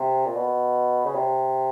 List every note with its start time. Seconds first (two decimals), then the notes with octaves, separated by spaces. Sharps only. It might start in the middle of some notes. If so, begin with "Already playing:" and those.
Already playing: C3
0.26 A#2
0.36 B2
1.05 C#3
1.15 C3